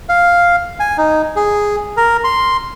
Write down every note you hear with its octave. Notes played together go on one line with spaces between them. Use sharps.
F5
G#5
D#4
G#4
A#4
C6